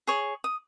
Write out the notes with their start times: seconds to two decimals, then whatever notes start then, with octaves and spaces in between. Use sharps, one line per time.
0.07 G#4 C#5 C#6
0.44 D#6